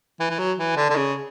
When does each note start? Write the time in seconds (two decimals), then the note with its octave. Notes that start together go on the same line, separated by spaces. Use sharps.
0.20 E3
0.30 E3
0.39 F#3
0.58 E3
0.76 D3
0.90 D3
0.96 C#3